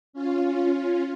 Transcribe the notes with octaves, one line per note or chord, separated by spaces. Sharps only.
C#4 F4